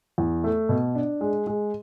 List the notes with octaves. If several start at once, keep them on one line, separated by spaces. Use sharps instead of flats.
E2
A3
B2
D4
G#3
G#3